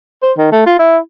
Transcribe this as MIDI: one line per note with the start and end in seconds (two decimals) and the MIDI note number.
0.22 0.32 72
0.37 0.47 51
0.52 0.64 57
0.66 0.75 65
0.79 0.98 64